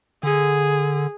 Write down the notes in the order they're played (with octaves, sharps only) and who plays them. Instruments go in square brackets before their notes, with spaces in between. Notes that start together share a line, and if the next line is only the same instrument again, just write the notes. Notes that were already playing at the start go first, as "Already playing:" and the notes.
[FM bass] D3 [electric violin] G#4